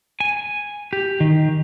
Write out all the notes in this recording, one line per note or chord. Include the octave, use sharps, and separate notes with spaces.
G#5
G4
D#3